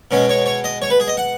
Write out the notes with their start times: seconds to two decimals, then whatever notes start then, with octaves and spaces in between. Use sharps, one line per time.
0.11 B2 G#3 C#4
0.29 C#5
0.46 C#5
0.64 D#5
0.82 C#5
0.90 B4
1.00 G#4
1.08 D#5
1.17 F#5